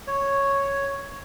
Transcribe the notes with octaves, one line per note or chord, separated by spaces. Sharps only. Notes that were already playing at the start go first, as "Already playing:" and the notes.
C#5